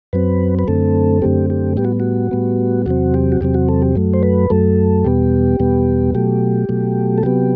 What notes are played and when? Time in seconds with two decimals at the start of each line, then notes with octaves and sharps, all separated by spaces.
0.13 F#2 F#3 C4 B4
0.59 B4
0.68 F#2 D3 A3 C4 A4
1.22 F#2 D3 A3 C4 G4
1.50 G4
1.77 A2 G3 B3 G4
1.85 F#4
2.00 F#4
2.31 A2 G3 B3
2.86 E2 C3 F#3 C4 F#4
3.14 G4
3.32 F#4
3.41 E2 C3 F#3 C4 G4
3.54 F#4
3.68 A4
3.82 G4
3.95 F#2 F#3 A3
4.14 C5
4.23 B4
4.50 F#2 F#3 A3 A4
5.04 E2 B2 G3 B3 G4
5.60 E2 B2 G3 B3
6.15 B2 F#3 A3 G4
6.69 B2 F#3 A3
7.18 A4
7.23 C3 F#3 B3 G4